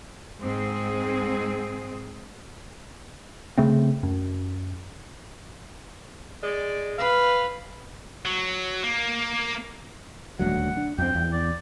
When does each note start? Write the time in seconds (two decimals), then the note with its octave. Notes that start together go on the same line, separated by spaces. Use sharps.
0.39 G#2 C4 G#4
3.58 C#3 A3 C4
4.03 F#2
6.44 G#3 D5
6.99 B4 F5
8.25 F#3
8.83 A#3
10.39 D#1 D2 F#3 F#5
10.77 D4
10.98 F2 C4 G5
11.15 E2
11.33 D5